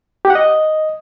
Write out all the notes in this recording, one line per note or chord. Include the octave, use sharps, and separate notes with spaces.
G4
F#5
D#5